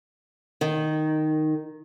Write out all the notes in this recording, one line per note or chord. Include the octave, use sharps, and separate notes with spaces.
D#3